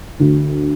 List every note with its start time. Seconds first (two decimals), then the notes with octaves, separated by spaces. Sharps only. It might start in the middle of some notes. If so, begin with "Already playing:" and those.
0.20 D2